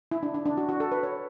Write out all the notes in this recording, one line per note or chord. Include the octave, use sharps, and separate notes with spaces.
E4
D4
D4
D4
F#4
F#4
A4
B4
C#5